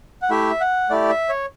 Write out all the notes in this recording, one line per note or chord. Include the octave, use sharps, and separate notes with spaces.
F#5
A3 E4 G4 E5
F#5
A3 E4 G4 D5
E5
C#5